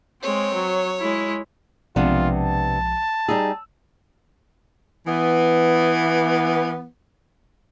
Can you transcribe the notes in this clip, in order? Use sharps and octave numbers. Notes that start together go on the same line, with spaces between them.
G#3 C4 C#5
F#3
G#3 E4
B1 C3 F3 G#3 B3 D4 F4
A5
G3 D#4 G#4 E6
E3 B3